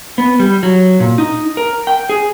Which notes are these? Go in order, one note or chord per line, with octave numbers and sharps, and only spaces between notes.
B3
G3
F#3
A#2
D#4
A#4
G5
G#4